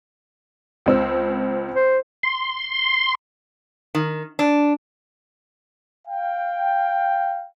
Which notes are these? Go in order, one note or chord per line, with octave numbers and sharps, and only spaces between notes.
C#2 C4 E6
C5
C6
D#3
D4
F5 G5